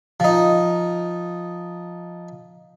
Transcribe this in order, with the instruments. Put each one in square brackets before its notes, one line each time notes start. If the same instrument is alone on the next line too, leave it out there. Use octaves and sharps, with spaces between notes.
[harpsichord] F3 D#4